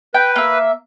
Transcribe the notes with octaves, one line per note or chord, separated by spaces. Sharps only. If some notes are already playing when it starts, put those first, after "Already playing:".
B4 G5
A#3 E5